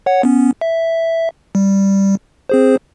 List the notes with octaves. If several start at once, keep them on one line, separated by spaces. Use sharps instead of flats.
C#5 F#5
B3 C#4
E5
G3
C4 G#4 C5